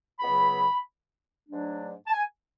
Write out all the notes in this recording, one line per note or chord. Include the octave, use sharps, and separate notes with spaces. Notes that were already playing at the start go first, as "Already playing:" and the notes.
C#2 C#3 F#3 B3 B5
G#2 F#3 A3 D4
A5
G#5